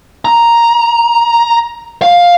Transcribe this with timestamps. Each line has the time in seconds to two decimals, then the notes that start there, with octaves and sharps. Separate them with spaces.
0.25 A#5
2.02 F5